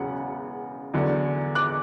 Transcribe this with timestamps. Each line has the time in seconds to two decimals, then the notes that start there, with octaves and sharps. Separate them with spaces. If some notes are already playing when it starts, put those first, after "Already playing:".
Already playing: E1 E2 C#3 F#3 F#5
0.94 E2 D3 F#3
1.55 D6 F#6